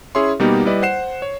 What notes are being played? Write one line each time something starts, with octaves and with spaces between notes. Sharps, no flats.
C#4 E4 G#4 C#5 E5 C6
B2 G3 A#3 B3 D#4 G4
G3 E4 B4 D5 D#5
C5 F#5 C7 E7
C#5